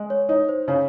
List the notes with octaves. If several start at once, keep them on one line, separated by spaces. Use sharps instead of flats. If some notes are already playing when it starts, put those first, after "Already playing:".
Already playing: G#3
C#5
D#4 C#5
C5
C#3 C#5